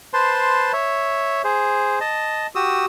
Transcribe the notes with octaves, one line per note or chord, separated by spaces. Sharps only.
B4 C5 A5 C6
C#5 E5
G#4 C5
D#5 A5
F#4 G4 D#6 E6